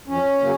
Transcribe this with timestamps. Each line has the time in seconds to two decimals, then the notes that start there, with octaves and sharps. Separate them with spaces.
0.07 F2 C#4
0.41 C#3 F#3 A#3